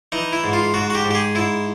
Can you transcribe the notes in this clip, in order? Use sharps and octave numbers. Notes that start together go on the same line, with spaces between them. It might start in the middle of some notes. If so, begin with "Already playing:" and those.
E3 D#4
E4
G#2
F4
G#2 F#4
F#4
G4
G#2
G4
G#4
G#2 E4